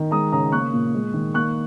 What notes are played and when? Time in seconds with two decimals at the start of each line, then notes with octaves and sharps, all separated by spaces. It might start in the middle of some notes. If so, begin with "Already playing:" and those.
Already playing: D#3
0.11 G#3 A#5 D#6
0.32 C#3 A#5 D#6
0.52 A#3 C#6 F#6
0.73 A#2
0.94 G#3
1.14 D#3
1.34 A#3 C#6 F#6